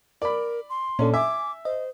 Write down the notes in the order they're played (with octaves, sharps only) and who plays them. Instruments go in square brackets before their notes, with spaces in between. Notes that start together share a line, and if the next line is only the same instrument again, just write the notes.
[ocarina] A#4 [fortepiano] D5 B5
[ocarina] C6
[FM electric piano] A#2 A4 [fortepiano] C#4 D4
[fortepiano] E5 [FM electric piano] G#5 [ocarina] D6
[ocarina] C5 [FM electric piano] D#5